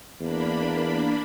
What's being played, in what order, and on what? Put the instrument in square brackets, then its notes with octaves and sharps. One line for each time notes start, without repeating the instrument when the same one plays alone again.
[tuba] E2 [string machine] A#3 D4 B5